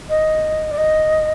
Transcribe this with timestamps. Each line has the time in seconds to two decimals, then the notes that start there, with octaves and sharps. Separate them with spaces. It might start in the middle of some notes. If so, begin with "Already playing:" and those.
0.09 D#5
0.71 D5
0.78 D#5